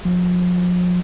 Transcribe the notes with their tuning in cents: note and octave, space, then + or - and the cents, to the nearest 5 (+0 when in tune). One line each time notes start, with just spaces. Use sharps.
F3 +40